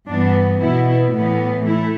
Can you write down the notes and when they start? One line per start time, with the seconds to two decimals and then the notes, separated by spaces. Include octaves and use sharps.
0.08 G2 E3 B3 D4
0.61 B2 B3 E4
1.14 A2 E3 B3
1.66 A3 E4